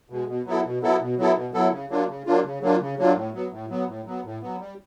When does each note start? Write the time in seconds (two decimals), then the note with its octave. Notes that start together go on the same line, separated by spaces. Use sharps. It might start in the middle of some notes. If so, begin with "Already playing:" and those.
0.10 B2 G#3
0.28 B2
0.46 F#3 B3 E4 A4
0.65 B2
0.82 F#3 B3 E4 A4
1.01 B2
1.18 F#3 B3 E4 A4
1.36 B2
1.53 F#3 B3 E4 A4
1.72 C#3
1.90 F#3 A#3 D4 F4
2.08 C#3
2.26 F#3 A#3 D4 F4
2.44 C#3
2.61 F#3 A#3 D4 F4
2.81 C#3
2.98 F#3 A#3 D4 F4
3.15 A2
3.33 F#3 B3
3.52 A2
3.70 F#3 B3
3.87 A2
4.05 F#3 B3
4.24 A2
4.42 F#3 B3
4.60 G3